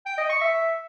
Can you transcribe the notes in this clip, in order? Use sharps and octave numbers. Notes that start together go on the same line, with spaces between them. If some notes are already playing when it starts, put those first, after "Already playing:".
G5
D#5
C#6
E5